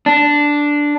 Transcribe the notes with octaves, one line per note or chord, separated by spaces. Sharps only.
D4